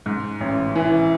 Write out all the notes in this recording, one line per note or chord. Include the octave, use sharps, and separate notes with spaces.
G#2
A1
E3